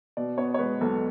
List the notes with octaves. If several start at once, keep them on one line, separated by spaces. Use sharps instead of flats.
B2 D5
B3 C#5
C#5
G#3 B4
B1 A4